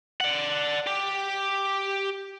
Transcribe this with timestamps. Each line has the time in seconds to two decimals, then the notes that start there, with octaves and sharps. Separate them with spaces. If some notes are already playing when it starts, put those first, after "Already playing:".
0.21 D5 F#5
0.87 G4